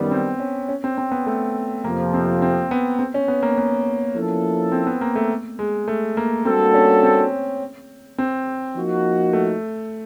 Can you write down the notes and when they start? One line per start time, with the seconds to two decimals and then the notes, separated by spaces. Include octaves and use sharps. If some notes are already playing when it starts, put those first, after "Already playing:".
Already playing: F#2 D#3 G3 B3
0.11 C4
0.40 C#4
0.68 C#4
0.84 C4
0.98 C4
1.12 B3
1.27 A3
1.84 F2 C3 F3 A#3
2.14 C4
2.42 C4
2.71 B3
2.99 C4
3.14 C#4
3.28 B3
3.43 A#3
3.58 B3
4.14 F3 A#3 C#4 E4 A4
4.72 C4
4.87 B3
5.01 A#3
5.16 A3
5.59 G#3
5.88 A3
6.17 A#3
6.45 G3 A#3 C4 D4 F#4 A4
6.74 C#4
7.03 C4
8.18 C4
8.76 F3 A#3 D#4 F#4
9.33 A3